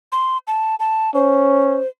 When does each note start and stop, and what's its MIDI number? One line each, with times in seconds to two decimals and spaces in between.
0.12 0.37 84
0.47 0.75 81
0.80 1.11 81
1.15 1.80 61
1.15 1.88 72